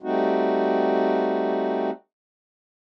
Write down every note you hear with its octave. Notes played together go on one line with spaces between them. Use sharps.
G3 A3 C4 D#4 F#4